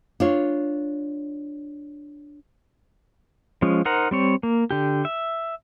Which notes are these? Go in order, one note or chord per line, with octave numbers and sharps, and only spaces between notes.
D4 F4 C#5
F3 G#3 C#4
D#4 A#4 C5 F#5 A#5
G3 C4 C#5
A#3
D3 G4
E5